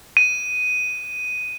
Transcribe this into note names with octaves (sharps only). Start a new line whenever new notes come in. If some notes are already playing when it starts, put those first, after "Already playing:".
D#7